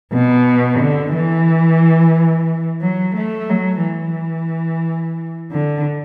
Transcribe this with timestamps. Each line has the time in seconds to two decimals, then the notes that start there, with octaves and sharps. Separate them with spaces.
0.13 B2
0.80 D3
1.13 E3
2.82 F#3
3.16 A3
3.49 F#3
3.83 E3
5.51 D3